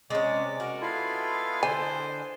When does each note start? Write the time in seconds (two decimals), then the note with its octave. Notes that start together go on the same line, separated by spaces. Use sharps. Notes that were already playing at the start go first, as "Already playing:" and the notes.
0.10 C3 G#3 C#4 D5 D6
0.60 F#4 A#4
0.81 G#3 B3 E4 F4 A4 F5
1.63 D3 G#3 C5 G#5